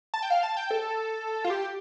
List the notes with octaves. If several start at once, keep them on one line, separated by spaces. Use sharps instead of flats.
A5
G5
F5
A5
G5
A4
F4
G4